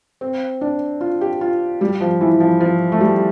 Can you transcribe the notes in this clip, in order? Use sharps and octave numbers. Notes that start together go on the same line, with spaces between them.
C4
D4
F4
G4
F4
G3
F3
E3
F3
F3
A3
G3